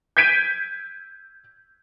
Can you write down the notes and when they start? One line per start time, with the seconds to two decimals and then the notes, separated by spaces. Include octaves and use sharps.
0.17 G6 G#6 B6 D7 D#7